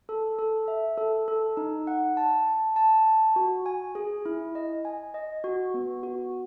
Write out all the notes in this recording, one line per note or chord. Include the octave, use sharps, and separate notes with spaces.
A4
A4
E5
A4
A4
D#4
F#5
A5
A5
A5
A5
F#4
G#5
G#4
E4
D#5
G#5
D#5
F#4
B3
F#4